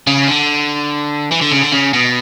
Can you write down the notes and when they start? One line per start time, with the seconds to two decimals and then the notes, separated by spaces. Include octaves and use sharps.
0.07 C#3
0.28 D3
1.32 E3
1.42 D3
1.52 C#3
1.62 D3
1.72 C#3
1.93 B2